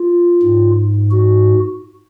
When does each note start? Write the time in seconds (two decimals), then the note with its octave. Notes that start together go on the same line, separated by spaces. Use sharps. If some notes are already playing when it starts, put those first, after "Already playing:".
Already playing: F4
0.42 G#2
1.11 F#4